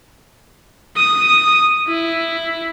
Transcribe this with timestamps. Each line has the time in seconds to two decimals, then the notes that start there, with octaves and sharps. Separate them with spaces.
0.97 D#6
1.88 E4